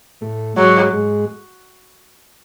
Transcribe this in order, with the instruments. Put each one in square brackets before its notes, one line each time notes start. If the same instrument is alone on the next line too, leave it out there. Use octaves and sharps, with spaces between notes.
[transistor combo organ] A2 A3
[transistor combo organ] G#2 G#3 [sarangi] F#3
[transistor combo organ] G#2 G#3